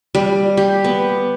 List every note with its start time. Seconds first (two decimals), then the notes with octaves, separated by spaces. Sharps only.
0.15 G3
0.57 G4
0.84 B3